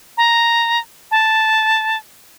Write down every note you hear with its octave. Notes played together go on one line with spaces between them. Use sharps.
A#5
A5